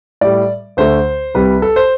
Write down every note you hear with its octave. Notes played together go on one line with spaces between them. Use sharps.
A2 G3 D5
D2 D3 A3 C5
C2 C3 G3 B4
A4
C5